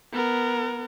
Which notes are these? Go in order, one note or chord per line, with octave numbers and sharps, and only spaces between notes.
B3 A#4